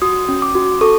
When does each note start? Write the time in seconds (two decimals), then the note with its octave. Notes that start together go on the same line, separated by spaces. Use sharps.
0.02 F#4 D#6
0.29 C#4
0.42 D6
0.55 F#4
0.81 A4 C#6